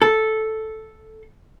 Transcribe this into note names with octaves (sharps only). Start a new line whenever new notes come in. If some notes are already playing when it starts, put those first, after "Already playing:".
A4